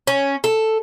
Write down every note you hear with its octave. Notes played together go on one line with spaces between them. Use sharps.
C#4
A4